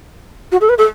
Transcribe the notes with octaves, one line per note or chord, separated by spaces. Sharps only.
F#4
A4
B4
A4